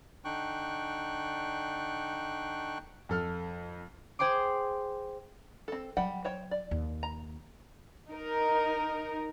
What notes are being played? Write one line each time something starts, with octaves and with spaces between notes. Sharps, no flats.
D3 D4 D#4 G5 C#6 F#6
F2 A4 F6
G#4 C5 G5 C6 D6
C4 A4
F#3 G3 F#5 G5
C5 C#5 G5
D5
D#2
A#5
D#4 A#4